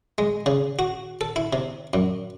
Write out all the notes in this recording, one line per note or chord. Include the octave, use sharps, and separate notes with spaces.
G#3
C#3
F#4
A4
E4
C3
F#2